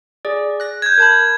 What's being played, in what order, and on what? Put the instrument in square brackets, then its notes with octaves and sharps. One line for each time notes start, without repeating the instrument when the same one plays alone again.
[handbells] G#4 D5
F#6 A#6
[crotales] G6 G#6
[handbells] A#4 A5 B5